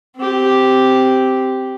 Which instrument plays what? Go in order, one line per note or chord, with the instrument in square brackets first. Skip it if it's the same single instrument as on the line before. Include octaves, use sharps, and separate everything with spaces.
[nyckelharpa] C4 G4